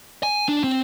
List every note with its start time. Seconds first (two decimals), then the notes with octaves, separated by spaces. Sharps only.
0.23 G#5
0.49 D4
0.64 C4